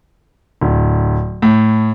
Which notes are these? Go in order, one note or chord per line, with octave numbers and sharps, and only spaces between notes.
D1
A2